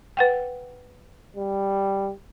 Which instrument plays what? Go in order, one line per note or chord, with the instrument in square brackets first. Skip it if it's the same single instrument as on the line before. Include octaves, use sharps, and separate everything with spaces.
[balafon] B4 F#5 G5
[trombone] G3